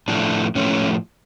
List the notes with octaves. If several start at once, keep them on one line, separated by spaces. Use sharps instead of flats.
A2 F3 A3 D4
A2 F3 A3 C#4